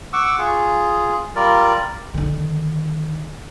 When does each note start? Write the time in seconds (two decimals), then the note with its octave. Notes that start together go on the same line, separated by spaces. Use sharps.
0.13 F#5 C#6 D6 E6
0.38 F4 G#4
1.36 G3 F4 A#4 D5
2.14 D3 D#3